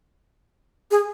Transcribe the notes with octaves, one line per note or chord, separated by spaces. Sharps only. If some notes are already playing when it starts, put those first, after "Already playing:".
G#4